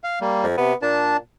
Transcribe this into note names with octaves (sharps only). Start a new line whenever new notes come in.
F5
G3 A#3
F2
C3 B3
A#2 D4 A5